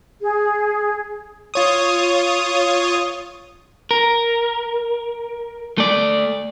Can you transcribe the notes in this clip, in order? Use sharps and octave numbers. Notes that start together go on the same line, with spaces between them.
G#4
F4 C#5 D#6
A#4
A3 D5